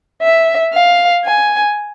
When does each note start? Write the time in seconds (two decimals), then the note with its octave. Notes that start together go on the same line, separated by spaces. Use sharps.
0.23 E5
0.73 F5
1.25 G#5